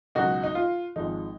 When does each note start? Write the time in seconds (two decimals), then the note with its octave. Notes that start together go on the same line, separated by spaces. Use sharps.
0.15 C#2 B2 F#3 D#4 F#4
0.43 D#4
0.55 F4
0.96 G#1 G#2 F3 G#3 D#4